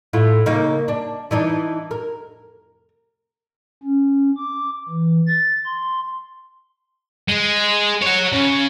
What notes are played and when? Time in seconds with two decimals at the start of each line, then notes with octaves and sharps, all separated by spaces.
0.13 A2 E4 F4
0.46 C#3 A#3 D#4
0.88 D4
1.31 E3 D4 D#4
1.91 A#4
3.83 C#4
4.37 D6
4.89 E3
5.27 A6
5.65 C6
7.28 G#3
8.02 C#5 F#5
8.32 C#3